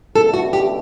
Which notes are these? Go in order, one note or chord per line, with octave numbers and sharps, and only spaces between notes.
C#2 B2 A3 D4 A4
F#4
G4